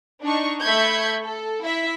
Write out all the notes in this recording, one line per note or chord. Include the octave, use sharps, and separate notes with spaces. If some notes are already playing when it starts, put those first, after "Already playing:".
D4 D#4 C#6
A3 E5 B5 C#6 G6 G#6
A4
E4 E5